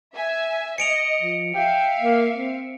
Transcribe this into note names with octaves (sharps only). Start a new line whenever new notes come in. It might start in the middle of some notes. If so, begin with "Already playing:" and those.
E5 G#5
D#5 C#7 D7 F7
F3
E5 F5 G5
A#3
C4